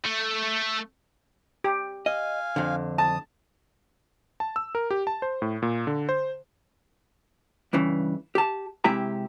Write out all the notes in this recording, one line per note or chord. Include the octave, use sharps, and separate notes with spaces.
A3
G4
D#5 F5 G#5
F2 D3
A5 D#6
A5
E6
A#4
G4
A5
C5
A2
A#2
D3
C5
G2 C#3 E3
G4 A5
C3 G#3 E4 G4 E5 A#5